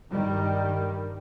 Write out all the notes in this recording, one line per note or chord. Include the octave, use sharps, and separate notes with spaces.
G2 D#3 G3